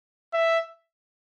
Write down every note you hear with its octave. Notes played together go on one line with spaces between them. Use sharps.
E5